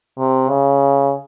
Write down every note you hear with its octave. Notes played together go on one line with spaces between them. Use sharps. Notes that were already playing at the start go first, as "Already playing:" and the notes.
C3
C#3